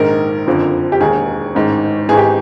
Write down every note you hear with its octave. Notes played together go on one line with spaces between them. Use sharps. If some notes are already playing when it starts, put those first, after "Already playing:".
Already playing: A#1 G#2 D#3 A#4
F#1 F2 D3 F3
G4
E1 D#2 D#3 G#4
A1 G#2 D#3
G#1 G#2 E3 G#4
G4